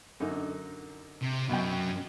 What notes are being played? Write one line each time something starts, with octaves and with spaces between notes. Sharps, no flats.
F#2 D3 D#4
C3
F#2 B2 G5